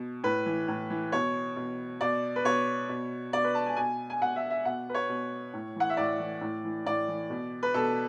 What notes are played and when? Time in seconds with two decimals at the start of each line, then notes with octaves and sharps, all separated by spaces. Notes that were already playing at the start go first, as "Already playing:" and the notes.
Already playing: B2
0.24 A2 B4
0.46 E3
0.68 A2
0.90 E3
1.12 B2 C#5
1.56 B2
2.01 B2 D5
2.36 B4
2.45 B2 C#5
2.89 B2
3.33 B2 D5
3.44 B4
3.55 A5
3.66 G#5
3.77 B2 G#5
4.10 G#5
4.21 B2 F#5
4.36 E5
4.50 E5
4.65 B2 F#5
4.89 B4
4.95 C#5
5.09 B2
5.54 A2
5.76 E3 F#5
5.90 E5
5.97 A2 D5
6.20 E3
6.41 A2
6.64 E3
6.86 A2 D5
7.08 E3
7.30 B2
7.63 B4
7.74 B2 A4